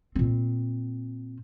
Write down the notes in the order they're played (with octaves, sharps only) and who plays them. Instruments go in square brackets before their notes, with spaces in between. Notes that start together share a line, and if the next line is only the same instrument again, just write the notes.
[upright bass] A#2 C4